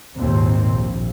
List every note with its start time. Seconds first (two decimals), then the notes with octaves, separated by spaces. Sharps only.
0.17 G#1 D#2 A#2 C4
0.72 A#1